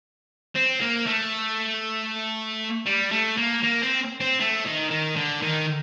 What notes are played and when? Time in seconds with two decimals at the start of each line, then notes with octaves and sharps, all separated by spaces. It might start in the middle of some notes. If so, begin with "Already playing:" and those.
0.55 C4
0.81 A#3
1.07 A3
2.86 G3
3.12 A3
3.37 A#3
3.63 A#3
3.82 C4
4.20 C4
4.40 A3
4.66 D#3
4.91 D#3
5.16 D3
5.42 D#3